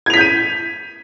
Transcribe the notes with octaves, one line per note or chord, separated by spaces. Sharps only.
G6 G#6 B6 D#7 F7